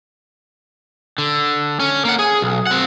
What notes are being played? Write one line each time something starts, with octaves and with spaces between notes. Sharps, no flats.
D3
C#4
A#3 F#5
G#4
B1
C4 F#5